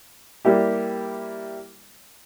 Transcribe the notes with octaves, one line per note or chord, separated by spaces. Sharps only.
G3 A#3 E4 G4